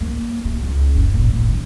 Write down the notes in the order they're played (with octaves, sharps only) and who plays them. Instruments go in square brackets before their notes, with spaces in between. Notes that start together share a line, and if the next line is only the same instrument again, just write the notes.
[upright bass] A#3
C3
C#2
F#1
A#2
A#2
D#3